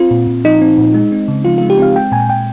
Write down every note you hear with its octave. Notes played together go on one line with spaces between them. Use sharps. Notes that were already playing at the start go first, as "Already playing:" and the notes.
Already playing: C4 F4
A#2
A#2
F3 D#4
C4
A#2
G#3
C4
C#3
F3 F4
G#3 F4
G4
C4 F5
G#3 G5
A#2 G#5
A#2 G5